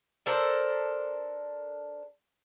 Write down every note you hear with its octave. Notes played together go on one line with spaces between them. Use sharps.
D4 A4 A#4 C5